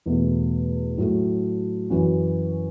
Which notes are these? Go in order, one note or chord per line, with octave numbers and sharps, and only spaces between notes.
E2 B2 A3
A2 F#3 A3
F#2 E3 C#4 F#4